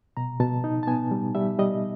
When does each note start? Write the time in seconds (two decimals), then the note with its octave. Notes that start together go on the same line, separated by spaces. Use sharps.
0.17 B2 A#5
0.40 B2 A5
0.64 D#4
0.83 A5
0.87 B3 G#5
1.11 G3
1.35 G3 E5
1.59 G3 D#5